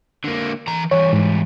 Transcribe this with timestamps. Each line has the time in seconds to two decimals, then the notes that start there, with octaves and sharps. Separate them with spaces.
0.24 D3 A#3
0.68 E3 A#5
0.91 E3 G3 C#5
1.13 G#2